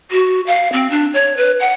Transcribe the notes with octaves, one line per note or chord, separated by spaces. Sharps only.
F#4
F5
C4
D4
C#5
B4
F#5